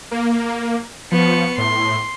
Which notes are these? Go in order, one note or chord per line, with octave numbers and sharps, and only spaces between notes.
A#3
F3 B3 C#6
A2 C6